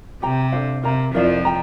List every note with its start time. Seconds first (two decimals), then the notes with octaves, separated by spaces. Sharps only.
0.22 C3 G4 C5 G5 A#5
0.52 D4 A4 C5 F5
0.83 C3 A#4 F5 A#5
1.14 F2 F3 E4 A#4 D5 F5
1.45 G5 A#5